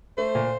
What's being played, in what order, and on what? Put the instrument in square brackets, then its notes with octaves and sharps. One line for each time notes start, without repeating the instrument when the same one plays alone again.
[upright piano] A3 [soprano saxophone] C5
[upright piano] A#2